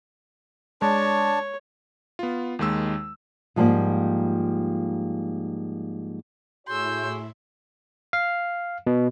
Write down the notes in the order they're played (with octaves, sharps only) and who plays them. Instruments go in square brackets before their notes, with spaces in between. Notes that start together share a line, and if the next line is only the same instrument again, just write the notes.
[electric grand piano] G#3 [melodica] D4 A5 [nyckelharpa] C#5
[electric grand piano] B3 F4
D#2 D#3 G#3 E6
[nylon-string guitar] G#2 F3 G3 A3 A#3
[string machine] A2 E4 [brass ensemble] F#4 G#4 C#5 [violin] C6 E6 [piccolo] G6
[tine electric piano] F5
B2